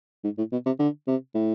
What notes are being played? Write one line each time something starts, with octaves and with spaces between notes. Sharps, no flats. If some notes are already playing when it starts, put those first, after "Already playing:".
G#2
A2
B2
C3
D3
C3
A2